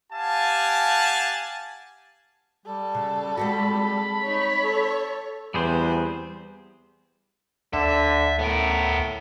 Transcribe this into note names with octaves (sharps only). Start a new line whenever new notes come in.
G4 F5 F#5 G#5 A5
G3 A4
C#3
G#3 C4 F#4 B5
D#4 C#5
A4
E2 G3 B3 C4 G#4 B4 C5
D2 D3 E5
A2 B3 A#4